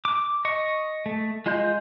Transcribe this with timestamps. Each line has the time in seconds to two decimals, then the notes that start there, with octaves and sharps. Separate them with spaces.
0.05 D6
0.45 D#5 C#6
1.06 A3
1.46 G#3 F4 D#5 C6 G6